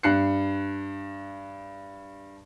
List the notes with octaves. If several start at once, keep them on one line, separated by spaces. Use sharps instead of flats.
G2 F#6 C7 C#7